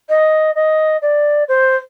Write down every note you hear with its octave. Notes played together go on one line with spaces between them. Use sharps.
D#5
D#5
D5
C5